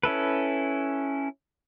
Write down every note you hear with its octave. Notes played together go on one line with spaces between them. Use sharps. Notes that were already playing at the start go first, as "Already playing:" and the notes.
C#4 E4 A4 B4